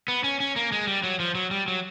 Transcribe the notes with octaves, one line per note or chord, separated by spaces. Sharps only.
B3
C#4
C#4
A#3
G#3
G3
F#3
F3
F#3
G3
F#3